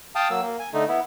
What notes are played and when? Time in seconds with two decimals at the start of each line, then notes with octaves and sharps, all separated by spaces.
0.15 F5 G5 A5 D#6
0.30 F#3 A#3 E6
0.41 A#3
0.60 G#5
0.73 D3 A3 D#4
0.88 B3 E4